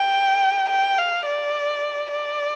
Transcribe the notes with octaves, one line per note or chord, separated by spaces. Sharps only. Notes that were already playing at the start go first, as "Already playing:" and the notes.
Already playing: G5
G5
F5
D5
D5